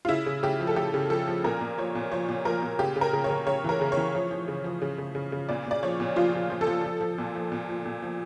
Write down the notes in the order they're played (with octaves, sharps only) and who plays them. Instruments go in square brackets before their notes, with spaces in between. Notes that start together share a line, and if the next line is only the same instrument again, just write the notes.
[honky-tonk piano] F4
C#3 E4
C#3
C#3 G4
F3
A4
C#3 G4
C#3
F3 A4
F3
A#2 A#4
A#2
F3 C#5
A#2
F3 C#5
A#2
F3 A#4
A#2
C#3 G4
C#3
A#4
C#3
C#5
C#3
C#3 C#5
E3 A#4
C#3
C#5
E3
F3
F3
C#3
F3
C#3
C#3
C#3
C#3
A#2 D5
A#2 D5
F3 C#5
A#2
F3 F4
F3
F3
A4
F3
F3
F3
A#2
F3
A#2
F3
A#2
F3